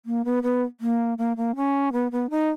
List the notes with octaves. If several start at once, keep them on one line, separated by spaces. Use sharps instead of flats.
A#3
B3
B3
A#3
A#3
A#3
C#4
B3
B3
D#4